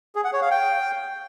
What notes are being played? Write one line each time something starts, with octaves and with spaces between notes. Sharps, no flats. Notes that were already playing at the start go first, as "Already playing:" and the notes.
G#4
F#5
C#5
F5
G5